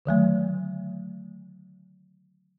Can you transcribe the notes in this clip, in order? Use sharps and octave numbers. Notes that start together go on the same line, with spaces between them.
D3 D#3 F#3 A3